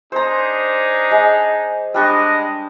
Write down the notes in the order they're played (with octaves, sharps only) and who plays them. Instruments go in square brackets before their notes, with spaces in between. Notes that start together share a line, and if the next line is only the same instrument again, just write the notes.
[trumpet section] D4 D#4 G#4 [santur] C5 A#5
[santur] G#3
[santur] G3 D4 C#6 [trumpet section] G#3 D#5